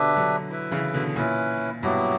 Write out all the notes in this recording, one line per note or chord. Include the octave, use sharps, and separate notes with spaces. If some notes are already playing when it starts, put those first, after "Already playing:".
Already playing: B2 D3 D4 G4 B4 E5
D3 F#3
E4 B4 E5
C#3 E3
B2 D3
A#2 C#4 E4 B4
G2 B2 F#3 B3 E4 G4